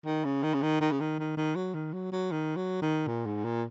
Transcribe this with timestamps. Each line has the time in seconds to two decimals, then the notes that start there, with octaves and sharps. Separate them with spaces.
0.05 D#3
0.25 C#3
0.43 D#3
0.54 C#3
0.62 D#3
0.81 D#3
0.91 C#3
1.00 D#3
1.19 D#3
1.37 D#3
1.56 F#3
1.74 D#3
1.93 F#3
2.12 F#3
2.31 D#3
2.56 F#3
2.82 D#3
3.07 A#2
3.26 G#2
3.44 A#2